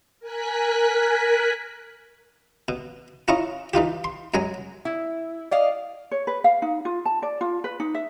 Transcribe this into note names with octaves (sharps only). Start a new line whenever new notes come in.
A#4 G#5 F#6 B6
B2
C#4 E4 F4 D#5 A#5 C#6
E3 D#4 F4 G4
C6
F#2 F#3 G#3 G#5 A#5
E4
D5 D#5 F5
C#5
B4
F5
D#4
F4
A5
D5
F4
B4
D#4
E5